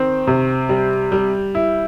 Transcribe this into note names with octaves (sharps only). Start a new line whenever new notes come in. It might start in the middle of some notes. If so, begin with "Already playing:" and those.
Already playing: D#3 C4
C3
G3
G3
E4